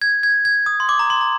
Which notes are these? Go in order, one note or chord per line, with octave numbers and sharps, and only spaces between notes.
G#6
G#6
G#6
D#6
C6
D6
A#5
C6
A#5